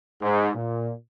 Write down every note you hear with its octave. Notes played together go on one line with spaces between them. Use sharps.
G#2
A#2